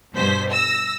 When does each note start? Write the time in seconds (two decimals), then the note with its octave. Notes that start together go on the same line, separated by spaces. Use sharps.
0.14 G2 B2 C5 B6
0.51 E6 A#6